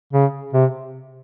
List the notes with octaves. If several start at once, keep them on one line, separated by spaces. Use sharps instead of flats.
C#3
C3